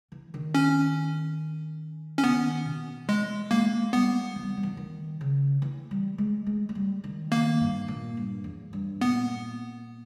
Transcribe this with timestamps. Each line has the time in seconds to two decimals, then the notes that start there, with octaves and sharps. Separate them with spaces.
0.12 E3
0.34 D#3
0.54 C#4
2.18 C#4
2.24 D#3 B3
2.66 B2
3.08 E3 G#3
3.51 G#3 A#3
3.93 G3 B3
4.36 E3
4.43 G3
4.49 E3
4.57 G3
4.63 E3
4.77 D#3
5.21 C#3
5.62 E3
5.91 G3
6.18 G#3
6.47 G#3
6.69 G#3
6.75 G3
7.04 D#3
7.31 D#3 A#3
7.61 G2
7.88 A#2
8.17 G2
8.44 E2
8.73 G2
9.01 A#2 B3